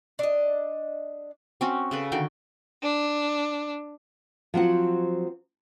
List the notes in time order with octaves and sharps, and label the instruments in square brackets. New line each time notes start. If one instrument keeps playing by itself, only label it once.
[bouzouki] D4 D#5
[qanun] C4 C#4 F#4
C#3 A4 B4
D3 D#3 F#4 G5
[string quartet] D4
[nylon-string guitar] F3 F#3 C4 F#5